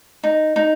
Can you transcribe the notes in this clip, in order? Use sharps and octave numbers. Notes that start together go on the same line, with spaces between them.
D#4
D#4